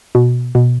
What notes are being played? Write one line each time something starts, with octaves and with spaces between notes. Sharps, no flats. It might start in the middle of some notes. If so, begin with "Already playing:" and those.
B2
B2